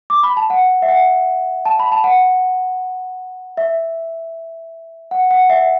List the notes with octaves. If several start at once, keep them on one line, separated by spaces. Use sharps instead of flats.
D6
B5
A5
F#5
E5
F#5
A5
B5
A5
F#5
E5
F#5
F#5
E5